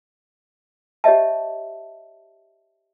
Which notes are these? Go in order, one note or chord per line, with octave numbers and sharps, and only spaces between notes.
G4 C#5 D#5 E5 A5